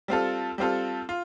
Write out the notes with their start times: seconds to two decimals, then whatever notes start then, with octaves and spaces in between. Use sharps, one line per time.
0.08 G3 C4 F4 A4
0.58 G3 C4 F4 A4
1.09 F4